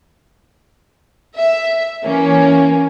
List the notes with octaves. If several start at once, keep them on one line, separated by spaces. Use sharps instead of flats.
E5
E3 A#3 C#4